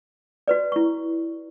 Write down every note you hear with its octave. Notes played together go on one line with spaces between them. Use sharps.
F#4 B4 D5
E4 C#6